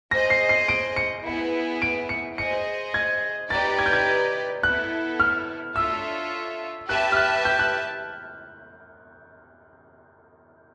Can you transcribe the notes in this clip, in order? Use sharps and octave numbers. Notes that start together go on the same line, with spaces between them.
G#4 C5 D#5 A#6
C7
C7
D7
C#7
B3 E4 G#4 B4
D7
C#7
G#4 C5 D#5 C#7
G#6
D#4 G4 B4 D5 A6
G#6
G6
G#6
B3 E4 A4 F#6
F6
D4 F4 A4 C#5 E5 E6
G4 B4 E5 A5 F#6
F6
F#6
G6
F#6